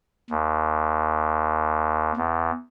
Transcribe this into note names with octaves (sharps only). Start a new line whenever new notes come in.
D#2
E2